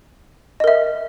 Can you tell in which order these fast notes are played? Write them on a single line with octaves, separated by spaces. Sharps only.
D#5 A#4 E5